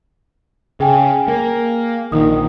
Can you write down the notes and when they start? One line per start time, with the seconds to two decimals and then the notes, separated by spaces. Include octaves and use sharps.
0.80 C#3 G#4 G5 G#5
1.28 A#3
2.12 A#1 D#3 D#6